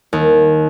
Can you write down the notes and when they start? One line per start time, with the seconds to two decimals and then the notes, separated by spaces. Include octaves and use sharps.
0.13 D#2